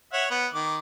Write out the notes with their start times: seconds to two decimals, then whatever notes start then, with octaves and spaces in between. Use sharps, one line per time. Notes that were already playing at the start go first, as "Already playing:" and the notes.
0.13 C#5 E5 F#5
0.30 B3
0.54 D#3 D6